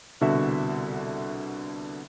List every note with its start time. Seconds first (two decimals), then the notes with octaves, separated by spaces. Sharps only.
0.21 C2 B2 D3 F#4 E5